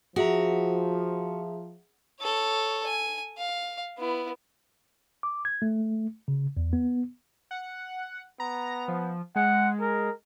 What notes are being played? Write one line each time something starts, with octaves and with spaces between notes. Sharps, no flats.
F3 F#4 G#4 E5 A#5
A4 C#5
G#5
F5
B3 E4
D6
G#6
A3
C#3
E2
B3
F#5
B3 A#5
F3
G#3 F#5
A#4